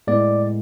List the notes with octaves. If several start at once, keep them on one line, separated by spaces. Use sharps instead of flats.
A2 G#3 B3 D5